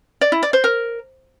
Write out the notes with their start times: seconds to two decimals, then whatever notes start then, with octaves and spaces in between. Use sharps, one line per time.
0.21 D5
0.32 E4
0.43 D5
0.53 C5
0.64 A#4